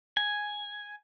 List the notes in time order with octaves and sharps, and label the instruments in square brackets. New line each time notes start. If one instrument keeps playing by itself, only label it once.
[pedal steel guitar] G#5